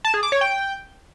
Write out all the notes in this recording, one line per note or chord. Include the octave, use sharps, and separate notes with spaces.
A5
G#4
D6
C#5
G5